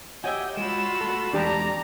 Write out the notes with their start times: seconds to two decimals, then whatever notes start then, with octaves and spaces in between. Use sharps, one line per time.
0.24 F#4 G4 C#5 D#5 E5 G5 G#5
0.57 G#3 F4 F#4 B5 E6
1.01 A3 A4
1.33 E2 G#3 D4 G4 D5 A5 A#5